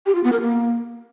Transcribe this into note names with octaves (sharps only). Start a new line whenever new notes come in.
G4
F4
B3
A#4
A#3